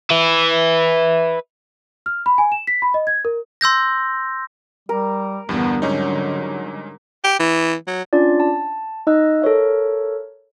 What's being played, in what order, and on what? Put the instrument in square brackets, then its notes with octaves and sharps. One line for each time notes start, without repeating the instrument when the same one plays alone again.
[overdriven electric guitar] B4 E5
[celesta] F6
B5
G#5
E7
B6
B5
D#5
G#6
A#4
[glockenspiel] C6 E6 G6 A#6
[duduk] G3 [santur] A#4
[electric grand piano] E2 G2 [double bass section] D3 G3 [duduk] B3
[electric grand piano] G#2 C#4 D#4 [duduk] F#3
[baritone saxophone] G4
E3
F#3
[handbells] C#4 D4 F4 D5
A5
D#4 D#5 E6 F#6
A4 A#4 C#5 E5